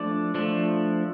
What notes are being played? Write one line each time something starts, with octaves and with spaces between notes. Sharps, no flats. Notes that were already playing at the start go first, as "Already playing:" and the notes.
Already playing: F3 A3 D4 D5
F3 A3 D4